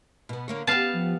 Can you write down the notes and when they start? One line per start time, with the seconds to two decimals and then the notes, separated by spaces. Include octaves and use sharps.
0.29 B2 B3
0.48 D3 A#3 C#5
0.67 B3 G4 F5 A5
0.93 F3